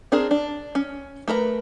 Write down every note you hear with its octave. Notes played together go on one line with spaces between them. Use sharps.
C4 D4 G#4 A#4
D4
C#4
A3 A#4 B4 A#5